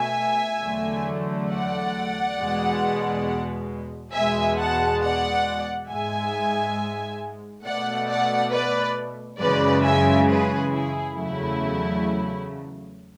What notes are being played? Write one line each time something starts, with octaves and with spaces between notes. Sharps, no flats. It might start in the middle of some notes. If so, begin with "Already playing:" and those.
Already playing: B2 A3 E5 G#5
E2 D3 F#3 A3
D5 F#5
E2 B2 G#3
E2 B2 G#3 E5 G#5
F#5 A5
D5 F#5
G#2 G#3 E5 G#5
B2 A3 D5 F#5
D5 F#5
B4 D5
F#2 C#3 E3 G#3 B4 D5
E5 G#5
G#4 B4
E4 G#4
E2 C#3 F#3 A3 E4